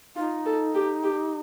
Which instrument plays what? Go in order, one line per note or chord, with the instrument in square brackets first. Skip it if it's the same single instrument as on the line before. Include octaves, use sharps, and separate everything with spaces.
[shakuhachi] D#4 [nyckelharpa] F4
[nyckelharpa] A4
G4
G4